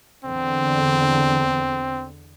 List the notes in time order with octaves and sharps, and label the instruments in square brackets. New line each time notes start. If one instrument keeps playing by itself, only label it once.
[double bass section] E2 D3 [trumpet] C4